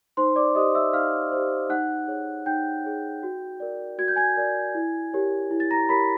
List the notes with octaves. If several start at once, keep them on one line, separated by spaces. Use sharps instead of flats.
D#4 C5 C6
D5 D6
G4 C5 D#5 D#6
E5 E6
D#4 F5 F6
G4 C5
D#4 F#5 F#6
G#4 C#5
D#4 G5 G6
G#4 C#5
F#4
A#4 D5
F#4 G#6
G6
G#5 G#6
A#4 D5
E4
G4 A#4 C#5
E4
A6
A#5 A#6
G4 A#4 C#5 B5 B6